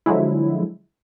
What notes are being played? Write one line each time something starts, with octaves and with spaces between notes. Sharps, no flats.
D3 F3 F#3 G#3 E4